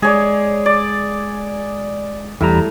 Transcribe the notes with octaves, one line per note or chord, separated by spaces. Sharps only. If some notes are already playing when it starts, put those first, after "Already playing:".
G#3 G#4 C#5 D5
D5
E2 A2 G3 A#5